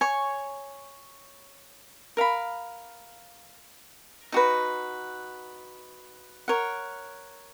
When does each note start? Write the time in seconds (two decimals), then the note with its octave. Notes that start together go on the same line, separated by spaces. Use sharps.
0.01 C#5 G#5 C#6
2.17 A#4 F5 B5
4.32 D#4 F#4 B4
6.48 A#4 C#5 F#5